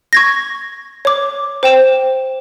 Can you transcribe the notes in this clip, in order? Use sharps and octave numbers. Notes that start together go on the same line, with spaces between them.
C#6 G#6 A#6
C#5 D6
C5 G5 E7